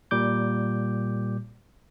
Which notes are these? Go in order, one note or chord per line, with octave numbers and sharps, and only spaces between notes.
A#2 G3 D6 G6